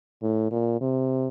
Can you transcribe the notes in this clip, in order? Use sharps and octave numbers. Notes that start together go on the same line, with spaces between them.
A2
A#2
C3